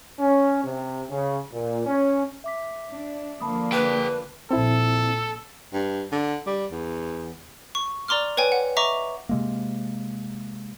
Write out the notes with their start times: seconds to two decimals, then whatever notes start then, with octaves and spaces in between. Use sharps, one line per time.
0.19 C#4
0.64 C3
1.10 C#3
1.52 A#2
1.86 C#4
2.44 E5 D6 B6
2.91 D4
3.40 D3 F3 A#3 A5 B5 D#6
3.72 G#4 B4 G5
4.51 A#1 C4 E4 A4
5.73 G2
6.12 D3
6.47 G3
6.71 E2
7.75 C#6
8.08 D5 A#5 C6 D6 F6
8.37 B4 C#5 G5 G#5
8.52 F#5
8.77 D#5 E5 A#5 C#6 D6
9.29 C3 G#3 A#3